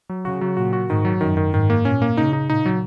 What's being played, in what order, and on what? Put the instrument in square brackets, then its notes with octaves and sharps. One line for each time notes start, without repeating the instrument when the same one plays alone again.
[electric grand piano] F#3
[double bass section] C#3 [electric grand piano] F#4
[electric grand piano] F#3
[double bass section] A#2 [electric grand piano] F#4
[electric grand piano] F#4
[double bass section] G#2 [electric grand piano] D#3
[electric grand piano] F#3
[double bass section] F#2 [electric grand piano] D#3
[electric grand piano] D#3
[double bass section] G#2 [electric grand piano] D#3
[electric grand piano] A#3
[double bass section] A#2 [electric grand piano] C#4
[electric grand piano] A#3
[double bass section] C#3 [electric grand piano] D#4
[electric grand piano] D#4
[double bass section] A#2 [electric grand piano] D#4
[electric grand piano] F#3